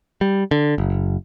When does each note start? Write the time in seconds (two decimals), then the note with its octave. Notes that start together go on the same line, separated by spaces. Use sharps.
0.21 G3
0.51 D3
0.78 F#1